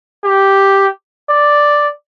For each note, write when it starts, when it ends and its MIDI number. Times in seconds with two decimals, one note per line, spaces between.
0.25 0.88 67
1.30 1.89 74